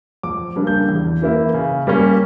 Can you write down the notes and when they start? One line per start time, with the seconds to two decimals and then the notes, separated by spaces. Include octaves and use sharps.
0.23 F2 D6
0.56 C#3 G3 A#3 D4
0.67 G6
0.89 E2
1.22 E3 A#3 E4
1.54 C#3
1.87 G3 A#3 C#4